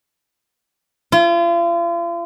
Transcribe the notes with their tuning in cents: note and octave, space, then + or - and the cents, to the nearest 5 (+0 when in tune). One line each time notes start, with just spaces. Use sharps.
F4 -40